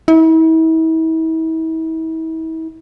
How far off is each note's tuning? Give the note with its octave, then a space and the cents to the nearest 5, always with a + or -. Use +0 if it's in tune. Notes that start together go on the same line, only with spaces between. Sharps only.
E4 -40